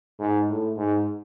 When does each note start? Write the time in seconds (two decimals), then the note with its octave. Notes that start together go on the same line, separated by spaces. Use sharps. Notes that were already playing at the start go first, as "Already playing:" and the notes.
0.20 G#2
0.48 A2
0.77 G#2